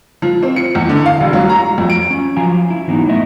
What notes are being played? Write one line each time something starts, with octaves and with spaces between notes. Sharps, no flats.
F3
C4
C#7
E2
D3
F5
E1
F#3
A#5
F2
D7
C#4
F3 F#3 F4 F5 G#5 A#5
E4
E3 F#3 B3 D#4
A2 A3 B3 D#5 E5